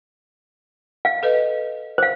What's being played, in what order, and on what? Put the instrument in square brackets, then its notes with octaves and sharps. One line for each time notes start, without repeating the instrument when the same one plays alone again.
[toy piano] F5
[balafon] A4 B4 D#5
[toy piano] C5 F5